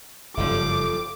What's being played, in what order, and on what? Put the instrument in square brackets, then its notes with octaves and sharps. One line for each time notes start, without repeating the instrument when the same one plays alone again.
[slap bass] F#1 G2 C#3 [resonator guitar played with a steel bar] F3 G3 A3 [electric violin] D6